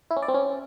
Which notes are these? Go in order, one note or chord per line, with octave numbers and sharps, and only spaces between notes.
E4
C#4
D5
C4
C#4